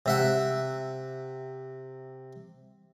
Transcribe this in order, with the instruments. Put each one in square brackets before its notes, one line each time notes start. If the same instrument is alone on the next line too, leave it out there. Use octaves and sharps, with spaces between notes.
[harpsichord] C3 E5 F#5